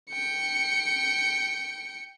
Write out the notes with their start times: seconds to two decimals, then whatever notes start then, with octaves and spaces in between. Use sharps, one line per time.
0.11 G5 C#7